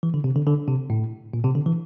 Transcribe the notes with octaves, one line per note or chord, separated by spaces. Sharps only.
E3
D3
C3
D3
D3
C3
A2
A#2
C3
D3
E3